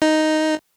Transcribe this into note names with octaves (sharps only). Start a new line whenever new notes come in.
D#4